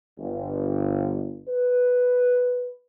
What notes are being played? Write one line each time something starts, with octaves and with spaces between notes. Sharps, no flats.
G1
B4